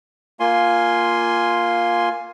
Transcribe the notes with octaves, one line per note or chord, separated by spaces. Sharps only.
A#3 F4 G#5 C6